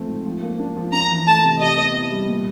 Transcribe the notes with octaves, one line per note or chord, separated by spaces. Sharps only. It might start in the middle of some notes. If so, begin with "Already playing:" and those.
Already playing: F3 A3 C4
G#2
F3
A#3
D4
F3
D4 A#5
E3
A3 A5
C3
G4 D#5
B3
E4
G3
A#2